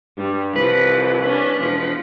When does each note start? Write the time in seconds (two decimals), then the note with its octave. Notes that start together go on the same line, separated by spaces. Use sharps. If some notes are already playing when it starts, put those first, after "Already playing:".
0.18 G2 G3
0.56 C2 E3 F3 B4
1.24 C#4 D4
1.59 E1 F3